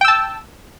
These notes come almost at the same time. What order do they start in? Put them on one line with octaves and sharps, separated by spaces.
G5 E6 A5